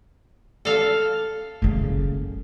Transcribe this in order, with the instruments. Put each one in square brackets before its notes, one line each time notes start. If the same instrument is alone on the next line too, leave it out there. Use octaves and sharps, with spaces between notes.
[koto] A4 F5
[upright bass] F#1 C#3